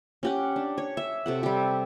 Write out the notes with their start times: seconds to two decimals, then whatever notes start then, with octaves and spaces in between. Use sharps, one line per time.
0.23 C#4 G4 F#5
0.56 D4
0.78 C#5
0.97 E5
1.26 C3 A4 F#5
1.43 G3 G4